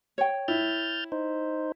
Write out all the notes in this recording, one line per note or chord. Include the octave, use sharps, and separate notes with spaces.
C#5 G5
E4 F6 G6 A6
D#4 C5